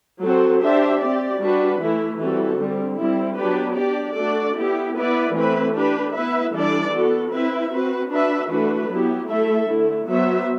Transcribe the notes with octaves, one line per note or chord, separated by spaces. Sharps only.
F#3 C4 F#4 A4 C5
D4 G4 C5 E5
C4 G4 D5
G3 D4 F#4 B4
E3 A3 E4
E3 G3 C4 F#4 A4
D3 G3 C4
G3 C4 E4
F#3 B3 D4 G4 B4
D4 G4 D5
A3 D4 F#4 A4 D5
B3 E4 G4
B3 E4 B4 D5
E3 A3 C4 E4 B4
D4 G4 B4
B3 E4 B4 E5
E3 G3 D4 A4 D5
B3 F#4 A4
C4 E4 B4 E5
C4 F#4 B4
D4 F#4 B4 E5
E3 A3 D4 F#4 B4
F#3 B3 E4 G4
A3 E4 A4 E5
D3 A3 E4
F#3 B3 F#4 C5 E5